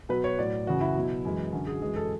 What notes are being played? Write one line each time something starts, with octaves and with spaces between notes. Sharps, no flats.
B2 F#3 B4
C#5
A2 F#3 D5
F#2 C#3 E3 F#4
E4
B2 F#3
F#2 E3 G#3
F#2 D3 F#3
G#4
F#2 E3 G#3 G#4
A4